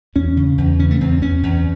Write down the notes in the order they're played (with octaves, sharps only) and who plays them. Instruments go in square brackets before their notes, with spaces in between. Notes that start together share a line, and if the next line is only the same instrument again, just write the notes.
[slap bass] E2 C#4
C#3
E2
C#3 C#4
A3
E2 C4
E2 C#4
E2